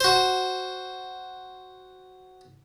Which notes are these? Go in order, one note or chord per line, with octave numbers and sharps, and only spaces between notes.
F#4 C5